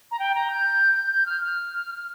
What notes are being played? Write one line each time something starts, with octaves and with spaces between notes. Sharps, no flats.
A#5
G5
A#5
G6
G6
F6
F6